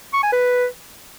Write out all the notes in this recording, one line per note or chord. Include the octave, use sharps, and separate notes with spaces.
C#6
G#5
B4